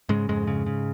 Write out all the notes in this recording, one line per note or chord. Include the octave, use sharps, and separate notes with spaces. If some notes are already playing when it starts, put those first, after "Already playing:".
G#2 C#3 G#3
F2 G#2 G#3
C#3
C#3